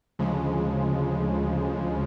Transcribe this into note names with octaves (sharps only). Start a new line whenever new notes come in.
D2 C#3 F3 G#3